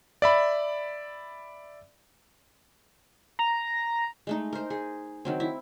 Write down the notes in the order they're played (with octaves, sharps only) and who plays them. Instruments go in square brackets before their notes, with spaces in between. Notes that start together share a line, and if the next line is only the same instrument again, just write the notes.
[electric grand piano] D5 E5 B5
[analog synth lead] A#5
[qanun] G#3 A3 D#4
A#4 C5
G#4
D#3 F#3 C4
E4